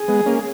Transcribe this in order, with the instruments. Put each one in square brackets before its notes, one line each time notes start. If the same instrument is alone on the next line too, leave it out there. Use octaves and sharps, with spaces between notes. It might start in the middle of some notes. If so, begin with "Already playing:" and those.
Already playing: [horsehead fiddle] G#4
[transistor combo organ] G#3 B3
A#3 C#4